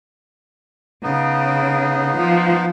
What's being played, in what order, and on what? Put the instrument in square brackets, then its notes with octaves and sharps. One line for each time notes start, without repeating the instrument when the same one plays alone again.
[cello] C#3 [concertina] B3 D#4
[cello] F3